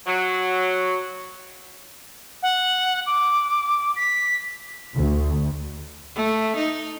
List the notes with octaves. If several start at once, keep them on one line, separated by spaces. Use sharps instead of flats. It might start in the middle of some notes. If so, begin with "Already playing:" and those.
F#3
F#5
D6
B6
D2
A3
D#4